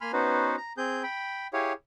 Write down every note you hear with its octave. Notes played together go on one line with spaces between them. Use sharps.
A#3 G#5 B5 C6 F6
B3 C#4 D#4 F#4 B4 C5
A#5
C4 G#4 G6
G5 B5
E4 G4 G#4 C#5 F5